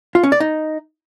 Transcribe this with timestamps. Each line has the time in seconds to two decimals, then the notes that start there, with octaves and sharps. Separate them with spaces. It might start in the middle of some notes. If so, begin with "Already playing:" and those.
0.15 F4
0.23 C#4
0.32 D5
0.40 D#4